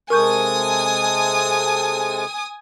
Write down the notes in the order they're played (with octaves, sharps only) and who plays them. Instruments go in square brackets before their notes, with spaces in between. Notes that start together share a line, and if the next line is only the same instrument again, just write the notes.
[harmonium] C3 G#3 A4 [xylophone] A#4 C#6 G6 [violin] G#5 D#6